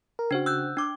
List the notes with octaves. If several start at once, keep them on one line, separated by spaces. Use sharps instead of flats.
A#4
C#3 D4 F#4 C5
E6 F#6 G6
D4 D6